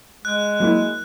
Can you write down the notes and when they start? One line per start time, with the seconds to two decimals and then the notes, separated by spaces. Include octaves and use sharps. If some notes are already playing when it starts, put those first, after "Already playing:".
0.25 G#3 F#6
0.60 F#3 A#3 E4